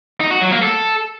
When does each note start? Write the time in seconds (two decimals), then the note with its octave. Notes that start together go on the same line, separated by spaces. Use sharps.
0.20 D#4
0.31 F#4
0.41 F#3
0.52 A#3
0.62 A4